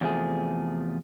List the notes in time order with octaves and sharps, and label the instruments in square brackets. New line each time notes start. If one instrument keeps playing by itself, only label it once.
[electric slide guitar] E2 C3 F3 A3 G#4